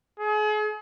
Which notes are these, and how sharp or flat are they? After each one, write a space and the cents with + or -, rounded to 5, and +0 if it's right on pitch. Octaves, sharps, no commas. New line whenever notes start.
G#4 +40